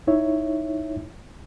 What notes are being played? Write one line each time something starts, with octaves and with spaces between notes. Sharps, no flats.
D#4 E4 C#5 E5